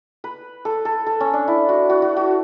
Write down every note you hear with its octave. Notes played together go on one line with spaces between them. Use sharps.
B4
A4
A4
A4
C#4
D4
E4
F#4
F#4
F#4
F#4